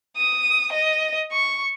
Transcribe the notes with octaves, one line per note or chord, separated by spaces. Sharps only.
D#6
D#5
C#6